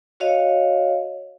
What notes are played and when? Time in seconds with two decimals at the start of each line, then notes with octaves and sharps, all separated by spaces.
0.20 F#4 C#5 D#5 F5